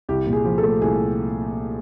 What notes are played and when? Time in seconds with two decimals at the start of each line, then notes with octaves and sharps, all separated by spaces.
0.09 C2 G4
0.27 A#2
0.33 G#4
0.45 F3
0.58 A4
0.63 A3
0.82 C2 G#4